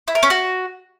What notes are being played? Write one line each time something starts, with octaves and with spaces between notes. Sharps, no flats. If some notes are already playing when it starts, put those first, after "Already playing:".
E4
A#4
C#4
F#4